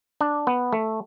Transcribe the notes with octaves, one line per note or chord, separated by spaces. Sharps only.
D4
B3
A3